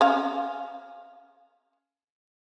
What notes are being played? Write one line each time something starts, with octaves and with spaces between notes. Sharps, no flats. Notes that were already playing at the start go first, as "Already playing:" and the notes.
C#4 F5